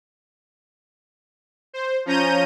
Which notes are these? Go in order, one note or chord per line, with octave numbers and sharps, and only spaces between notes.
C5
F3 C#4 A#5 G6 D#7